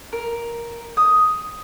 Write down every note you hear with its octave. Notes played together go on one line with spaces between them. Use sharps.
A#4
D#6